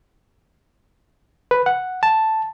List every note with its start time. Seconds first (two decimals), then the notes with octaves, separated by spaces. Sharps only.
1.51 B4
1.66 F#5
2.03 A5